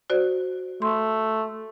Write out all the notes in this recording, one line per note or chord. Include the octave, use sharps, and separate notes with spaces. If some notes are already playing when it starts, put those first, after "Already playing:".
F#4 C5 D5
A3 C6